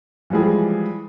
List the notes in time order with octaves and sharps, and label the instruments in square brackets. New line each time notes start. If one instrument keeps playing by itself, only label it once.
[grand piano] E3 F3 G3 G#3 G#4